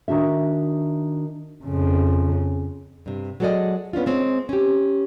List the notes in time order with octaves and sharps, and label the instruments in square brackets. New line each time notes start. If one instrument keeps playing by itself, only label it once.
[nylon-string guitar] D#3 D4 F#4 E5
[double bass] F2 C#3
[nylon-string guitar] G2 C3
F#3 G#3 F#4 A4 D5 D#5
B3 C#4 D4 F4
G#3 C4 C#5
C#4 G4